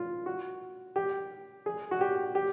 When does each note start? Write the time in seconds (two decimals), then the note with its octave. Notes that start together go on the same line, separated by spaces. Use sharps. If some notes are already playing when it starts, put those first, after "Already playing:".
Already playing: F4
0.26 F#4
0.96 G4
1.66 G#4
1.91 F#4
2.01 G4
2.35 G4